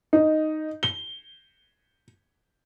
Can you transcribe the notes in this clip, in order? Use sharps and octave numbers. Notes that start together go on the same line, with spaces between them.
D#4
G7